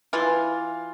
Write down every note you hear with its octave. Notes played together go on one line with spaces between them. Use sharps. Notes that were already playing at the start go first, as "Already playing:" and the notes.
E3 F4